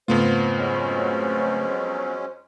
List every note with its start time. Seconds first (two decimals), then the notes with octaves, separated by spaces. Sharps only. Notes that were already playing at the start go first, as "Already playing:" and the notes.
0.08 F2 G#2 C#3 A3 B3 F4 C5
0.57 F#3 G#3 C#4